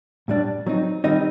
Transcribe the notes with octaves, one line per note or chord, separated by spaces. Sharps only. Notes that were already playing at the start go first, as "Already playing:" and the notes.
A2 G3 D4
F#3 C4 D#4
D#3 G3 C4 D#4 D#5